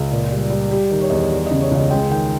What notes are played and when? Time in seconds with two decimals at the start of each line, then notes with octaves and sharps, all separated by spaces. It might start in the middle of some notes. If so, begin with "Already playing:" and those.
Already playing: C#2 G#4
0.11 A#2
0.31 G3
0.50 G3
0.71 G3 G4
0.91 D#3
1.01 C#5
1.10 E2 D#5
1.18 C#5
1.31 G3
1.46 D#5
1.51 C#3
1.62 C#5
1.71 C#2 D#5
1.91 G#3 G5
2.11 D#3 G5